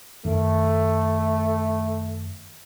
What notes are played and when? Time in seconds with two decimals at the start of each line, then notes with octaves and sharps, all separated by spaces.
0.25 F#2 D#3 A3